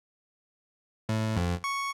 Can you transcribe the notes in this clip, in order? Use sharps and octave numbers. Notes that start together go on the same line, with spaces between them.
A2
F2
C#6